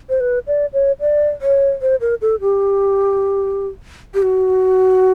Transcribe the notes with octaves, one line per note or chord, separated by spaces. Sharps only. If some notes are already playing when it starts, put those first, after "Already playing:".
C5
B4
D5
C#5
D5
C#5
C5
A#4
A4
G4
G4
F#4